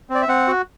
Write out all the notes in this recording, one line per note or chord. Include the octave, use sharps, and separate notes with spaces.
C4
D5
E5
C4 F#5
F#4